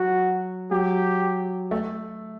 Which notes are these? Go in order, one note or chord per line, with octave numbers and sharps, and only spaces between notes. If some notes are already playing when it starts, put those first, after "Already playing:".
Already playing: F#3 F#4
F#3 G4
A3